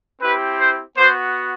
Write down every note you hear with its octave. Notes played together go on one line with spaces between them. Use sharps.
C4 E4 G4 B4
C5
B3 F#4 C5